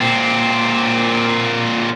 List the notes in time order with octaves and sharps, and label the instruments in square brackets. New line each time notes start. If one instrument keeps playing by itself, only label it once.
[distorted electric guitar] A#2 C4